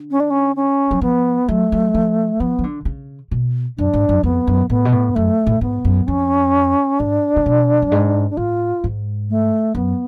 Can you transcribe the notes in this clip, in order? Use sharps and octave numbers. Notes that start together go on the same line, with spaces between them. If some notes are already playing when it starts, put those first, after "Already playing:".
Already playing: D3
C#4
D4
C#4
C#4
F#3
F3 B3
F#3 A3
F#3
F3
F3 B3
F3
D3
C#3
B2
F#2 D4
G#2
F#2
F2 B3
F#2
A2 B3
B2
A2
F#2 A3
A2
G#2 B3
F#2
F2 C#4
G#2 D4
C#3
B2
F#2
G#2
D4
A2 F4
G#2
A3
F#2 B3